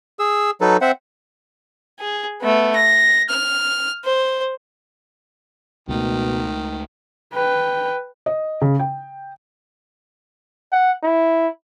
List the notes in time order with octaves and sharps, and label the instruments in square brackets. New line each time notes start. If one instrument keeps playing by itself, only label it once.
[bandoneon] G#4 E6
F#3 D#4 A4 B4
C4 C5 E5 F#5
[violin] G#4
A3 B3
A#6
F6
C5
[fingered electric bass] C#2 G#3 A3 [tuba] B2 [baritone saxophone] D#3
[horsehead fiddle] B4 G5
[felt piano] D#5
C#3
G5
[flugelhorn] F#5
E4